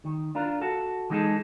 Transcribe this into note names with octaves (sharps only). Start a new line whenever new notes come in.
D#3
D4 F4 A#4
F#4 A4
E3 G#3 D#4 F#4 G#4 A4